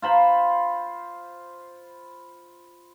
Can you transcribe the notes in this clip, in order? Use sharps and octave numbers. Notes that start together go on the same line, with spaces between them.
F4 C5 B5